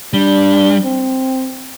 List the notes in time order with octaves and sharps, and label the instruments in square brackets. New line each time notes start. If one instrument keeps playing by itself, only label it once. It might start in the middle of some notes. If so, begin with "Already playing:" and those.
[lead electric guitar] G3 [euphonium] D4
[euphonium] C4